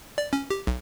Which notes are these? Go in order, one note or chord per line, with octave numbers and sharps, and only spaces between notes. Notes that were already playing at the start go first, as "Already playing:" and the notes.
D5
C#4
G4
B1